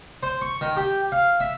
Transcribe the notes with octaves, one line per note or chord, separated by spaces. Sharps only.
C5
C#6
D#3
G4
F5
E5